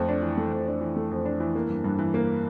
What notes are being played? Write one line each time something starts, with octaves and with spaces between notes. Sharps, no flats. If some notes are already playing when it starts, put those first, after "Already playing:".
Already playing: F2 A3
D4
E3
A3
F2
D4
E3
A3
F2
D4
E3
A#3
G2
G2
E3
A#3